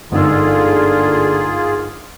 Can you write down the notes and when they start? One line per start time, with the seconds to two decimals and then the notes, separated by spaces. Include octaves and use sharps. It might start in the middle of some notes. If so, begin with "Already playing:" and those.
0.12 G1 G#2 D3 A#3 F4 G#4 E6